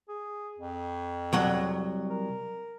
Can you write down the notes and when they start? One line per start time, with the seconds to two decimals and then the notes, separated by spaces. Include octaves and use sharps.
0.09 G#4
0.58 F2
1.33 C2 F#3 F#5
2.10 A#4